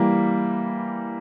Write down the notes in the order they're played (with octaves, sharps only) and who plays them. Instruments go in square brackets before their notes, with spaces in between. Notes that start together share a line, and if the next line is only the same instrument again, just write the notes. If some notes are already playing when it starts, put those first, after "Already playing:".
Already playing: [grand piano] E3 G3 A#3